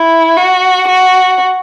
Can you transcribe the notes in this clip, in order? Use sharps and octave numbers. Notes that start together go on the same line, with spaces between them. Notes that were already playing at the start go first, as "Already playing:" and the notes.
Already playing: E4
F#4
F#4